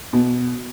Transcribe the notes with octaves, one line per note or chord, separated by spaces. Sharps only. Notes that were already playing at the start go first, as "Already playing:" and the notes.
B2